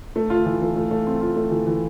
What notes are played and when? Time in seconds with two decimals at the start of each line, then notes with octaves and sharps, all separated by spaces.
0.16 A3
0.30 F4
0.46 E3
0.61 A3
0.76 A3
0.91 A3
1.07 C4
1.21 F4
1.36 A3
1.51 E3
1.66 E3